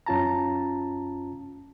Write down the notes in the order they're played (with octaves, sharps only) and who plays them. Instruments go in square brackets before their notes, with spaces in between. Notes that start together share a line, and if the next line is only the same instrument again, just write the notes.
[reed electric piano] F#2 C#4 F4 A5 A#5